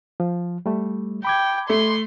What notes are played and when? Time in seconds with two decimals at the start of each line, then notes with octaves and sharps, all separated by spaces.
0.20 F3
0.66 G3 A3
1.25 G5 B5 D6 G#6
1.69 A3 C6